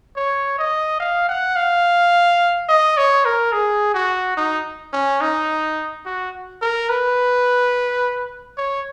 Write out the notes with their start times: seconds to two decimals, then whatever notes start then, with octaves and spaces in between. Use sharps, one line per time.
0.16 C#5
0.58 D#5
1.00 F5
1.29 F#5
1.56 F5
2.69 D#5
2.97 C#5
3.25 A#4
3.52 G#4
3.94 F#4
4.37 D#4
4.92 C#4
5.21 D#4
6.05 F#4
6.61 A#4
6.89 B4
8.57 C#5